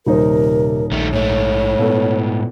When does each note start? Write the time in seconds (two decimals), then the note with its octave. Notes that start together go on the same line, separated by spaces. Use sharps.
0.06 D#1 C3 D#4 A#4 C5
0.92 A#1 D#3 A3
1.13 G#2 A3 C#5
1.79 A#2 B3 A4